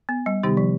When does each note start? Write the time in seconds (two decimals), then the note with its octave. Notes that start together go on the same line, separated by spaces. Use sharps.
0.09 B3
0.26 G3
0.43 C3 D#3 G3 B3 D#4 G4
0.57 F3